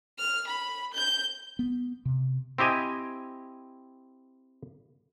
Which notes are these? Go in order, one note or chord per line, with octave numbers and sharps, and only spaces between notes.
F6
B5
G6
B3
C3
C4 E4 G4 D#5 G#5